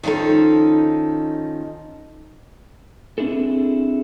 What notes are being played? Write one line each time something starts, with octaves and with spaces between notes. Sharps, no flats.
D#3 F3 C#4 D#4 A4
C4 D4 E4 G#4 A4